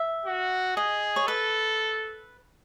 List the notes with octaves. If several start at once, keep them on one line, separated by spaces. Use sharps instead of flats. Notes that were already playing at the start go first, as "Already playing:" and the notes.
Already playing: E5
F#4
G#4 D#5
C#5
A4 B4